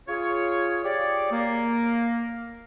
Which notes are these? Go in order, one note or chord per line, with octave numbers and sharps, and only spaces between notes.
F4 G#4 C#5
G4 G#4 C#5 D5
A#3